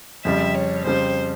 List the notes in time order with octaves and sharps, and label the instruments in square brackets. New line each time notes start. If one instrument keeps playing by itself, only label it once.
[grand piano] F2 C#3 G3 [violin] E5
[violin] C#5
[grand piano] F2 C#3 G3 [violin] C5